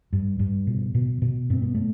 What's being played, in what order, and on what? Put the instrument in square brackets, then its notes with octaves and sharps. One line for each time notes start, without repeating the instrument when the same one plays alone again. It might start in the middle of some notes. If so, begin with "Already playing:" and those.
[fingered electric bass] G2
G2
B2
B2
B2
G2 C4
B3
A3